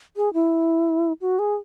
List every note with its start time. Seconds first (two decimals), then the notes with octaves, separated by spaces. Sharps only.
0.16 G#4
0.34 E4
1.21 F#4
1.39 G#4